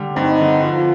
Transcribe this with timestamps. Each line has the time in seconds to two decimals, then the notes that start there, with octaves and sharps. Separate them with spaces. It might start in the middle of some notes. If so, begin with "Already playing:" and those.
Already playing: D3 G3
0.16 G2 C4 D#4
0.41 D3
0.63 F3 F4